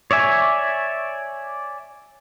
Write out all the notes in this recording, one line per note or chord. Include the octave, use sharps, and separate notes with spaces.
C#5 D5 E5 G#5